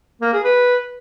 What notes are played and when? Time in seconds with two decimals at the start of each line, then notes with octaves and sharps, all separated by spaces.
0.22 A#3
0.33 G#4
0.44 B4